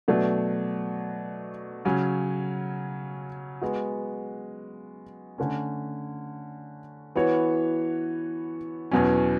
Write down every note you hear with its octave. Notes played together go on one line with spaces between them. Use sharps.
B2 F#3 A3 D4
C#3 F#3 C#4
G#3 B3 F#4
D3 A3 C#4
E3 B3 F#4 C#5
E2 B2 F#3 C#4